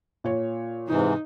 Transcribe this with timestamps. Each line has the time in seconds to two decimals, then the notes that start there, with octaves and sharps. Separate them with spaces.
0.24 A#2 C#5
0.89 G#2 C3 E3 D#4